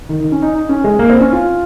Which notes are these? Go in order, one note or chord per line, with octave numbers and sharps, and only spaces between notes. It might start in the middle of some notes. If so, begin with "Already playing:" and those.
D#3
D#3
C#4
D#4
D#4
C#4
G#3
A#3
C4
C#4
F4